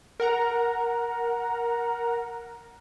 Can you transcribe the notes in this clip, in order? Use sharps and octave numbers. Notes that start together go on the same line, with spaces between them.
A#4 F#5 A#5